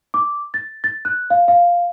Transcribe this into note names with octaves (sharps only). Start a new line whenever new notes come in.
D6
A6
A6
F#6
F5
F5